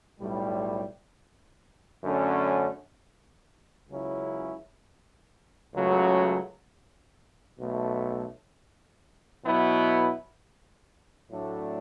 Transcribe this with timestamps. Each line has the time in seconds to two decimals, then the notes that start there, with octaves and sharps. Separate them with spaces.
0.19 B1 A2 G3
2.04 F#2 D3 A3 C#4
3.89 C#2 C#3 F#3 C#4 E4
5.75 C#2 C#3 F#3 A3
7.60 B1 B2 A3
9.44 B2 F#3 B3 E4
11.30 A2 F#3 A3 D4